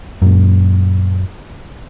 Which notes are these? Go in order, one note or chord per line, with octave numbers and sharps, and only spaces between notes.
F#2 A#2